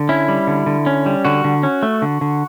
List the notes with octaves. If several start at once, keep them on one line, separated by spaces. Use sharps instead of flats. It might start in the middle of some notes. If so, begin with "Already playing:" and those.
Already playing: D3
C#4 E4
G3
D3
D3
C#4
G3
D3 F#4
D3
C#4
A3
D3
D3